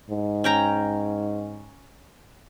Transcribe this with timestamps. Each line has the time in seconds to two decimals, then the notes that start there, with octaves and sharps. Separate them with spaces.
0.10 G#2
0.44 C#4 G5 A#5